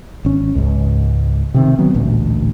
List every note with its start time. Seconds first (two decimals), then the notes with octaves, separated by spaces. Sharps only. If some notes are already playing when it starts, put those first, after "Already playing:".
0.25 G#1 C#4
0.55 C#2 G#2
1.54 C3 D#3 C4
1.78 D#3 F#3 B3
1.94 A1 D2 A#2